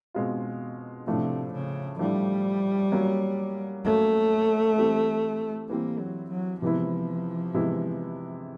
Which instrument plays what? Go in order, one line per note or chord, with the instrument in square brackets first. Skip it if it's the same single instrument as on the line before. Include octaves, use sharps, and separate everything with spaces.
[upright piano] B2 G#3 C4 F4
[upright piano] A2 F3 A3 D4 [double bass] C3
[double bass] C#3
[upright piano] A2 F3 A3 D4 [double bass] G3
[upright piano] F#3 A#3 C#4
[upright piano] F#3 A#3 C#4 [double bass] A3
[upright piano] E3 G3 C4
[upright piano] E3 G3 C4 [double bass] A#3
[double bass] F#3
F#3
[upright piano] C3 E3 G#3 B3 E4 [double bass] F3
[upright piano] C3 E3 G#3 B3 E4